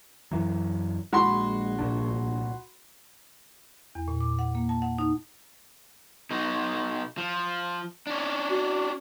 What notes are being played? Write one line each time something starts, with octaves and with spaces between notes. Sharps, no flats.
F#2 E3 F#3
A#1 G#3 F#4 B5 C6
C2 A#2 D4
E2
A#2
D6
F#5
A#3
A5
F#5
D#4
B2 D#4
F3
C#4 D4
F#4